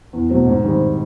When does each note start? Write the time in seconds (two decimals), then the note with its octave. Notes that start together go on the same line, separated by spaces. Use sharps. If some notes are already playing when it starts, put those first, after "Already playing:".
0.13 E2
0.29 B2 F#3 A3 C4
0.46 G#2
0.63 D#3 G3 C4